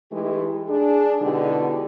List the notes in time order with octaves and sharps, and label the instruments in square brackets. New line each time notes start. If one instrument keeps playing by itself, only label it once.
[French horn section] E3 G#3 A3 D#4 E4 G4
D4 G#4
B2 D3 G#3 D#4 E4 G4